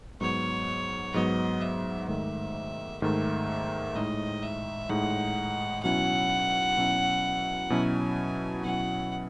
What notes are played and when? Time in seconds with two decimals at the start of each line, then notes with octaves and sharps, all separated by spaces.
0.21 G#2 F#3 B3 C#5
1.14 G#2 F#3 B3 D#5
1.61 E5
2.08 G#2 D#3 A3 E5
3.02 G#2 D#3 A3 E5
3.95 A2 G#3 D#4 D#5
4.42 E5
4.89 A2 G#3 D#4 F#5
5.83 B2 F#3 C#4 E4 F#5
6.77 B2 F#3 C#4 E4
7.70 B2 F#3 C#4 E4 G#5
8.64 B2 F#3 C#4 E4 F#5